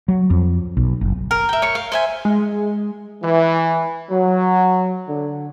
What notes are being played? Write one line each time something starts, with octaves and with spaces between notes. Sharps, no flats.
F#3
F2
B1
F#1
A#4
E5 G5
C#5 C#6
F5
C5 E5 G#5
G#3
E3
F#3
D3